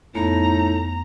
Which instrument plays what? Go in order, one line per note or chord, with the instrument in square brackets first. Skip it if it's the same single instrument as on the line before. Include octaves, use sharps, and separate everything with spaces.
[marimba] F2 B3 [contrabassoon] A2 [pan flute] D#4 [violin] A#5